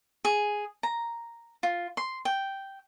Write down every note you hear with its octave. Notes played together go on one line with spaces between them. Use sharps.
G#4
A#5
F4
C6
G5